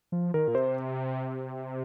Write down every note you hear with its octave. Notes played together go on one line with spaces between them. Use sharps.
F3
D#3 A#4
A#2
C3 C5